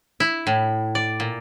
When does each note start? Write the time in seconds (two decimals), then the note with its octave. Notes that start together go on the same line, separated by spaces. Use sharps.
0.20 E4
0.47 A2
0.95 D5
1.20 A#2